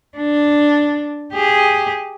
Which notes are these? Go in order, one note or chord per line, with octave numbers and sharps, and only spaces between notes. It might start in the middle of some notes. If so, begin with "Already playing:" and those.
D4
G4 G#4